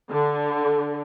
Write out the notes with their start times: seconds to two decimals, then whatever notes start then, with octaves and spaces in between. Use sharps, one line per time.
0.10 D3